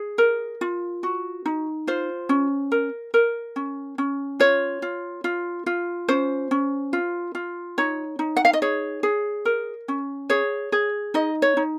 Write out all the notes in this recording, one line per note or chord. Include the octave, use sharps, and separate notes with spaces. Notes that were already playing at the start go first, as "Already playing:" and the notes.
Already playing: G#4
A#4
F4
F#4
D#4
F4 C5
C#4
A#4
A#4
C#4
C#4
F4 C#5
F4
F4
F4
C#4 C5
C#4
F4
F4
D#4 C#5
D#4
F#5
F5
D#5
G#4 C#5
G#4
A#4
C#4
G#4 C#5
G#4
D#4 D#5
C#5
D#4